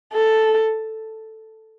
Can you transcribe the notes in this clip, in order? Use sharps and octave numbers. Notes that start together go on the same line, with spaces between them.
A4